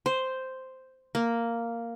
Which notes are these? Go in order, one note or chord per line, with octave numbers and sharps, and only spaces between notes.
C5
A#3